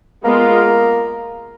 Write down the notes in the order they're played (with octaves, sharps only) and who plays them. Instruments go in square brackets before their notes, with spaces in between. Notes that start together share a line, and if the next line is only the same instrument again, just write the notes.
[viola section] G#3 B3 F4 A#4 [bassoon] A#3